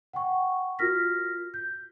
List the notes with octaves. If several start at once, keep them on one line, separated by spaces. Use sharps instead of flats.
F#5 G5 C#6
F4 F#4 A#4 F6 A#6 B6
G6